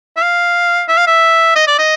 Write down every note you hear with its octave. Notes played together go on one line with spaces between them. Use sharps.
E5
F5
E5
F5
E5
D#5
D5
D#5